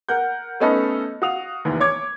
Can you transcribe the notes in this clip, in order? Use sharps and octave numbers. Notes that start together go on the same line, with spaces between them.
A#4 F#5 G6
A3 B3 C#4 D#4 A4 B4
F#4 F5 D#6 F7
F1 D#2 E3
C#5 D6 G#6